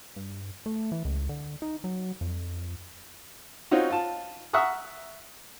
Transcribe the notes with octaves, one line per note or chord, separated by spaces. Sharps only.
G2
A3
E3
C#2
D3
D#4
F#3
F2
C4 C#4 D#4 F4 F#4
F4 A5
E5 F#5 A#5 C#6 D#6 F6